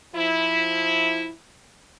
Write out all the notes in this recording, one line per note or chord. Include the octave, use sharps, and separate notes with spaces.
F3 E4